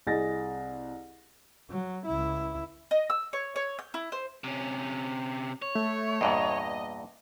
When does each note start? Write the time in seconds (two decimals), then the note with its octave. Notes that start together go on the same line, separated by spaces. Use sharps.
0.07 C2 G#4 D#5 A6 A#6
1.70 F#3
2.06 C#2 E4
2.91 D#5
3.10 E6
3.33 C#5
3.56 C#5
3.79 G6
3.94 E4
4.12 C5
4.44 C3 C#4
5.62 C#5
5.75 A3
6.21 E2 G2 A#2 D#5